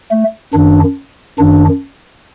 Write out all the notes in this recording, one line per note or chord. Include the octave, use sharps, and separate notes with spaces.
A3
F#2 D#3 D4
F#2 D#3 D4